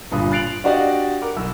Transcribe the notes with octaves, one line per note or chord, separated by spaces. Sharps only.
G1 G2 A#2 D#6
F#6 A6 C7 D7 F7 F#7
D4 F#4 G4 D5 D#5 F5
A#4 F#5 D6
B1 E6